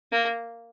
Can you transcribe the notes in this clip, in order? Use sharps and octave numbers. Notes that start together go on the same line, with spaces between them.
A#3